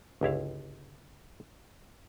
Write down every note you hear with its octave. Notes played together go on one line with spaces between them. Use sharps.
G1 C#2 E4 F5